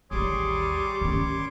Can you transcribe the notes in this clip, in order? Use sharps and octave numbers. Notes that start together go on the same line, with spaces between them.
A1 D#2 G3 G#4 C#5 C6 D6
D#3 C#4